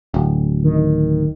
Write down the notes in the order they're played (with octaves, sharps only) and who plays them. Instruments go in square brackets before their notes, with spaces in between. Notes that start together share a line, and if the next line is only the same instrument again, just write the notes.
[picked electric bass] D1
[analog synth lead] D#3